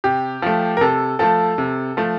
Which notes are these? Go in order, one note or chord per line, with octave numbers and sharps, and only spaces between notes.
C3 G4
F3 A3
A#4
C3 A4
F3 A3 A4
C3
F3 A3